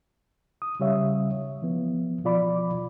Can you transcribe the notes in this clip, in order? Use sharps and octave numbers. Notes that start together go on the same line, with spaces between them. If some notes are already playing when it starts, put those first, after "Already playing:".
D#6
C#3 G3 G4 C#5 E5 F5
E3 F3 B3
B2 F3 F4 D5 B5 D6